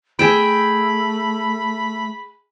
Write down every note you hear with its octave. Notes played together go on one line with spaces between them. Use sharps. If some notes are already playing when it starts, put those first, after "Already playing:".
A3 G#4 E5 G5 B5